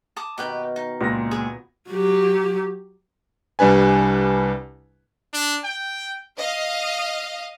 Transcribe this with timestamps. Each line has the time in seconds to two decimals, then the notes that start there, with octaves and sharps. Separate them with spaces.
0.16 A5 D6 D#6
0.38 B2 D#3 G4 B4 G5
0.76 D#4
1.01 C#2 A#2 F4 A#6
1.31 G#4
1.90 F#3 G4
3.59 C2 G3 D4 B4 G#5
5.33 D4
5.64 G5
6.38 D#5 F5